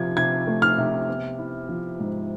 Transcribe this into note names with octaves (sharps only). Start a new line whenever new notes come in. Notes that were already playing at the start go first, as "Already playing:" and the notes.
Already playing: C3 F3 G#6
C3 G#6
A3
F6
C3
B3
E4
F3
G#2